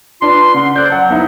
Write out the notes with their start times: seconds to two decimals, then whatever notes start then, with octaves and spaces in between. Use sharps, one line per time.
0.22 D4 F4 B4 C6
0.54 C#3 F#5 C6
0.76 A4 C5 D5 F#6 G6
0.90 F#3 F#5 A5
1.09 B3 D#4 E4